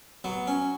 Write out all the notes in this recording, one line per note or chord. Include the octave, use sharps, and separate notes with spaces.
F#3 B3
C#4